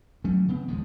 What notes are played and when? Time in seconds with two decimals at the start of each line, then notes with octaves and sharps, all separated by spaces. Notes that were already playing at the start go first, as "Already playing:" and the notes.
0.24 F#3 A3 C4 C#4
0.48 C#3 B3 C4
0.67 D#1 D2 F3 G#3